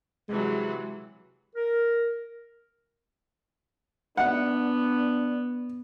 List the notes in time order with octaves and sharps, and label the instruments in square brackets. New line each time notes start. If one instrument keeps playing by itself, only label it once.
[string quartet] C3 E3 F#3 [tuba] G#3
[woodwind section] A#4
[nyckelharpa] B3 [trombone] D4 [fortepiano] F#5